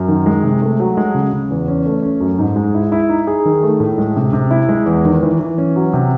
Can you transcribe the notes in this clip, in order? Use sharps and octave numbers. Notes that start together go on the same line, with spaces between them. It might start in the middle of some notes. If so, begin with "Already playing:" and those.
Already playing: F#2
D#3
G#3
C3
A3
F#3
G#3
C#3
C#3
E2
C#4
A3
C#4
F#2
G#2
G#3
E4
E4
D#4
G#4
D#3
A3
A2
G#3
C3
C3
E4
G#3
E2
D#3
E3
E3
C#4
F#3
C3